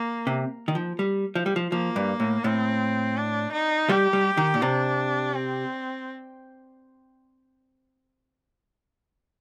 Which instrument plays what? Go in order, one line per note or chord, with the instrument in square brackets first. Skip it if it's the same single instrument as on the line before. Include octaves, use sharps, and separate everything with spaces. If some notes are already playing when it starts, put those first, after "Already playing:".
Already playing: [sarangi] A#3
[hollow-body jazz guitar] C3
D#3
F3
G3
F3
G3
F3
[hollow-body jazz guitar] F3 [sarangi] A#3
[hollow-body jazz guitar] G2
A2
[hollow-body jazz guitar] A2 [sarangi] C4
[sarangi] D4
D#4
[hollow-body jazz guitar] G3 [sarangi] G4
[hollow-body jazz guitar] G3
D#3
A#2
[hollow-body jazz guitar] C3 [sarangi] D4
[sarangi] C4